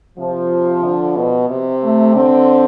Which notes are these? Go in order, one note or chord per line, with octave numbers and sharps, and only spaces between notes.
C3 F3
D3
B2
C3
A3
D3 C4